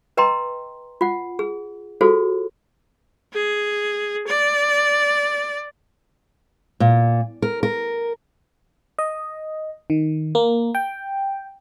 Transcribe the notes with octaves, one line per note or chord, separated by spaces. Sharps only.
B4 D#5 G5 A#5 C6
F4 F#5
G#4
F4 F#4 G#4 A4 C5
G#4
D5
A#2
A#4
A#4
D#5
D#3
A#3
G5